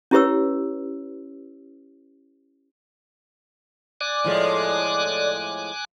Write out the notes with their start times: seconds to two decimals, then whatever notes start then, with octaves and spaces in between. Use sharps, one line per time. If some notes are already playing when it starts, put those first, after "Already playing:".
0.11 C#4 E4 G4 B4 C#5 E6
4.01 D5 G#5 D6 F#6
4.24 A2 F3 G#3